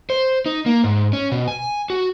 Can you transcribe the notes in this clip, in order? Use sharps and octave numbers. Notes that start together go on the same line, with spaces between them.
C5
D#4
A#3
G#2
C#4
B2
G#5
F#4